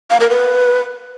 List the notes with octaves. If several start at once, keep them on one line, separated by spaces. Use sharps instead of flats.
F5
A#4
B4